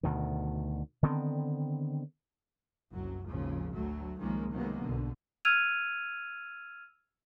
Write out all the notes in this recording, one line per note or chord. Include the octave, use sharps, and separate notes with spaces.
D2 B2 D#3
D3 D#3 B3 C4
F#1 C2 F#2 F#3
G#1 D#2 C#3 F3
D2 F#3 A3
C2 D#3 F3 G#3 A#3 C#4
C3 D#3 F#3 G#3 A#3 B3
B1 G#2 B2 D3
E6 F6 G#6 D#7 F7